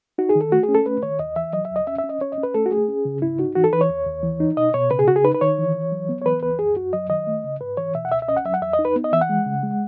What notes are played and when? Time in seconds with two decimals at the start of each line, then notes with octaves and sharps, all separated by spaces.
0.18 D#4 F#4
0.29 G#4
0.35 D#3
0.41 A4
0.52 A3 F#4
0.63 G#4
0.69 C#4
0.75 A4
0.86 A3 B4
1.03 D#3 C#5
1.19 D#2 D#5
1.36 E3 E5
1.53 F#3 D#5
1.65 E5
1.70 D#2
1.76 D#5
1.87 C#4 E5
1.98 E5
2.04 C#4
2.09 D#5
2.21 C#4 C#5
2.32 D#5
2.38 C#4
2.43 B4
2.54 A3 A4
2.66 F#4
2.71 A3 G#4
2.88 C#4
3.05 C#3
3.22 G#2 E4
3.39 D#4 F#4
3.55 E3 F#4
3.64 A4
3.73 E3 B4
3.81 C#5
3.90 D#2
4.06 D#2
4.23 E3
4.40 D#4
4.57 B2 D#5
4.74 B2 C#5
4.91 C#3 B4
4.99 G#4
5.08 C#3 F#4
5.16 G#4
5.24 D#4 B4
5.35 B4
5.41 D#3 C#5
5.58 E3
5.75 E3
5.92 F#3
6.09 B3
6.22 C#5
6.25 E3 B4
6.43 C#2 B4
6.59 F#2 G#4
6.76 F#2 F#4
6.93 F#3 D#5
7.10 D#3 D#5
7.27 A3
7.43 C#3
7.61 G#2 B4
7.77 E3 C#5
7.95 B2 E5
8.05 F#5
8.11 C#2 E5
8.22 E5
8.28 C#4 D#5
8.36 F#5
8.45 F#3 E5
8.54 F#5
8.61 E2 E5
8.73 D#5
8.79 D#4
8.85 B4
8.96 B3
9.04 D#5
9.13 E3 E5
9.21 F#5
9.29 G#3
9.46 C#3
9.63 G#3